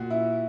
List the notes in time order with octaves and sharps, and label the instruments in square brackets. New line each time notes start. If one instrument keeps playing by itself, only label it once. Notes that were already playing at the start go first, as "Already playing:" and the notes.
Already playing: [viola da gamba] A#2 [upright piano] F#4
[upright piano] E4